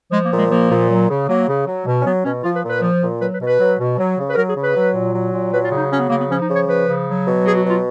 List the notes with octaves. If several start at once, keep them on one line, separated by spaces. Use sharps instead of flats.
F3 G#3
A#3
A#2
G#3
F3 A#3
A#2
F#3
C#3
F#3 A#3
C#3
F#3
B2
C#4
F#3 B3
B2 C#4
F3 F4
B4
A#2
B4
F3
A#2
F#3 B4
B4
B2
B4
F#3
B2
F#3
C#3
B4
F#3 A#4
G#4
C#3
B4
F#3
A#2
F#3
A#2
F#3 B4
F4
C#3
D#4
F#3 C#4
B3
C#3 A#3
B3
F3 C#4
D#4
C#3
C#5
F3 B4
C#3
F#3
B2
F#3 G#4
F#4
B2
F4